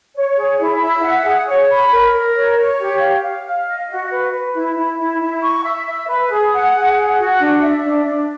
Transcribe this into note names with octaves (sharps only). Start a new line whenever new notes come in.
C#5
G#4
E4
E5
F#5
G#4
C#5
B5
A#4
A#4
C#5
C#5
G4
F5
F5
F5
D#5
F#4
B4
B4
E4
E4
E4
E4
C#6
E5
E5
B4
G#4
F#5
G#4
F#5
F#4
D4
E5
D4
D4